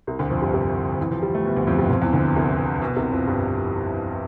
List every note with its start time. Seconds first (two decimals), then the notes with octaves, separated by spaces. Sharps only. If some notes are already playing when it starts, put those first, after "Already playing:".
0.07 C2 C3
0.19 D2 D3
0.30 F2 F3
0.42 G2 G3
0.53 C3 C4
1.01 E3
1.12 F3
1.22 G3
1.34 A3
1.45 B2 B3
1.56 D2 D3
1.67 F2 F3
1.78 G2 G3
1.90 F2 F3
2.02 E2 E3
2.13 D2 D3
2.25 B2
2.36 C2 C3
2.82 B2
2.96 C2 C3
3.12 F2 F3
3.27 G2 G3